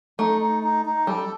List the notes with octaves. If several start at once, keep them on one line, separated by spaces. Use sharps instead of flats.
A3 D#4
D#4
D#4
D#4
G3 A4